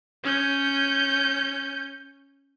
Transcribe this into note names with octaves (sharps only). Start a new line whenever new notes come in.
C#4 G6